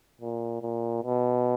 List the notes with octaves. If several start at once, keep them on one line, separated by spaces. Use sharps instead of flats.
A#2
A#2
B2